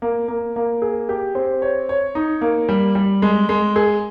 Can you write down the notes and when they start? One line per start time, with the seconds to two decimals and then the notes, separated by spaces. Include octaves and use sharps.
0.02 A#3
0.28 A#3
0.56 A#3
0.82 G#4
1.09 G4
1.35 C4
1.62 C#5
1.89 C#5
2.15 D#4
2.41 A#3
2.69 G3
2.95 G3
3.22 G#3
3.49 G#3
3.76 G#4